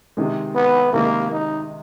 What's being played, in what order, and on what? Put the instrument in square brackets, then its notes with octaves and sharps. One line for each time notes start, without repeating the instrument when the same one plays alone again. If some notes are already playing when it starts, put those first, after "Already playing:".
[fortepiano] C3 D#3 G#3
[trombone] B3
[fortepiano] C3 D#3 G#3 [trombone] A#3
[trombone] D#4